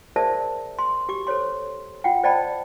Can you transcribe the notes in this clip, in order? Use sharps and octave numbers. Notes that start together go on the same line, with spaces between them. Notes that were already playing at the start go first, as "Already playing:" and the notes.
G#4 A#4 C5 D5 E5 A5
C6
G4 D6
A4 C5 C#5 C6
F4 F#5 G5
C5 D5 D#5 G5 A5 B5